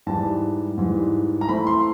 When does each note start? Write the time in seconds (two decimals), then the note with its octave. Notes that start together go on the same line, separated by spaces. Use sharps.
0.07 G#2 E3 G3 A5
0.78 G#2 E3 G3
1.41 A#5
1.49 E3 A3 C4 E4 B5
1.67 C6